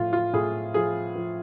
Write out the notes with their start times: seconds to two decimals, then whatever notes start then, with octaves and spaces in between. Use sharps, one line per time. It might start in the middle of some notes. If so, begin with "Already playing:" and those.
Already playing: A2 F3 F4
0.13 F4
0.33 A2 G#4
0.74 F3 G#4
1.15 F3